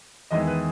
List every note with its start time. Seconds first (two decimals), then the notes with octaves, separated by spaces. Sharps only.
0.31 E2 D#3 G#3 B3 E4 D#5
0.47 B4